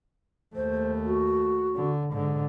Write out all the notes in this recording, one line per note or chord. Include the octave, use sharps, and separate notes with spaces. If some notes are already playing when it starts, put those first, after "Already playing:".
D#2 A3 C5
F#4
D3
G#2 D3